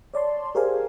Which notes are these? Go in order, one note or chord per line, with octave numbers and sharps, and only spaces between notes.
C#5 D5 A5 C6
G4 G#4 A#4 C5 F5 G#5